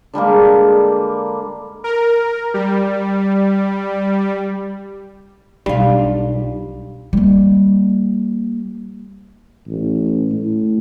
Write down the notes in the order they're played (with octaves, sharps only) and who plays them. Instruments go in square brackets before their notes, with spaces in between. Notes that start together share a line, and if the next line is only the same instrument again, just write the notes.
[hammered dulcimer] D3 G3 G#3 A#3
[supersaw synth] A#4
G3
[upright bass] B1 [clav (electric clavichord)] G3 [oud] D4 F4
[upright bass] G3 A#3
[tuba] A1
A2